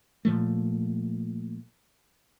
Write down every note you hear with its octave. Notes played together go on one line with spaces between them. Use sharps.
A#2 F3 A3